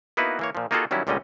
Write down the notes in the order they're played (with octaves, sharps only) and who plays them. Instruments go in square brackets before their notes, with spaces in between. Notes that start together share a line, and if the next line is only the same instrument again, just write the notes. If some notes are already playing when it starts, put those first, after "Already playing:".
[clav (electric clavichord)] A#3 B3 D#4 E4 F#4 B4
E3 A#3 C#5
A#2 F3
A#3 D#4 F4 F#4 G#4 A4
D#3 F#3 G3 C#4 E4
C#2 A#2 D3 G3 C#4 D#5